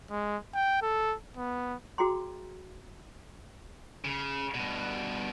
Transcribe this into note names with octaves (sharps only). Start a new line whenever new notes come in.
G#3
G5
A4
B3
F#4 G#4 G5 A#5 C6
C#3
G2 B2